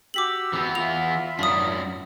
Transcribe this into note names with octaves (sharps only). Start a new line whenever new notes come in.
F#4 G4 D6 E6 B6 F#7
E3 B3
F4 E5 B5 F7
F#2 D4 D#6 B6